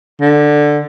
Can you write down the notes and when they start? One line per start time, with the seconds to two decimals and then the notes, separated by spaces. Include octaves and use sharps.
0.21 D3